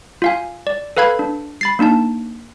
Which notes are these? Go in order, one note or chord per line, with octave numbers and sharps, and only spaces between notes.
F4 F5 G#5
D5
A4 B4 F5 B5 G#6
D4
B5 A6 C7
A#3 D4 D#4 A5